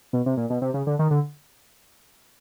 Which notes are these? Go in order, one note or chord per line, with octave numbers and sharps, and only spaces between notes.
B2
C3
A#2
B2
C3
C#3
D3
D#3
D3